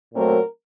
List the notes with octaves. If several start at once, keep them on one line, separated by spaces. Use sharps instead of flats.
A#2 F#3 A3 C4 A#4